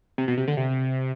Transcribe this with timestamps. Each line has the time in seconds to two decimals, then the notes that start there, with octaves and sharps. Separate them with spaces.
0.18 C3
0.28 B2
0.37 C3
0.48 D3
0.57 C3